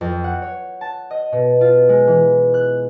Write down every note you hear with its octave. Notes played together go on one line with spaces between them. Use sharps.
F2
F#5
C#5
A5
D#5
B2
F4
G#3
E3
F#6